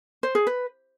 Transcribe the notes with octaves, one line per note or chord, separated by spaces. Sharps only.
C5
G#4
B4